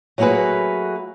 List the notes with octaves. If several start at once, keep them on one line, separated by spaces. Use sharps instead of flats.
F#3 A3 A#3 F#4 G#4 B4